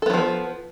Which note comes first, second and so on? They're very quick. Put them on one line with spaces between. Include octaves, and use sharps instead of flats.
A4 B3 F#3 F3